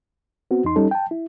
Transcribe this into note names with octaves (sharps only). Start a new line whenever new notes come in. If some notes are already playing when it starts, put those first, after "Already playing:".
B3 C4 F#4
E2 D#4 C6
G3 C#4 D#4 A4
G5 A5
E4